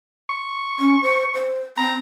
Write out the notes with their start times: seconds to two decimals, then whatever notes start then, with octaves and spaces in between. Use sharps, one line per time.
0.30 C#6
0.79 C#4
1.02 C5
1.34 C5
1.78 C4 A#5